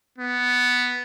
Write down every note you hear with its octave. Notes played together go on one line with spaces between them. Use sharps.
B3